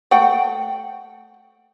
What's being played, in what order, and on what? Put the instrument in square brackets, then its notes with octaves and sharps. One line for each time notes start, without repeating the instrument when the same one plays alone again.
[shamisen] A3 F#5 G5